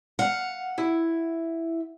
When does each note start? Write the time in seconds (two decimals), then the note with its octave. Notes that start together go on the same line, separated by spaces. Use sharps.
0.19 F5 F#5
0.78 E4